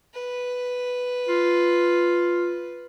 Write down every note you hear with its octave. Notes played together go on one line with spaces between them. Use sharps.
B4
F4